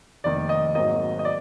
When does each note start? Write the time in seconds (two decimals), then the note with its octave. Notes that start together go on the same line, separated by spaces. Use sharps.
0.24 F1 F2 D#3 A#3 D5
0.49 D#5
0.75 G#1 G#2 F#3 A#3 D#5
1.19 D#5
1.25 D5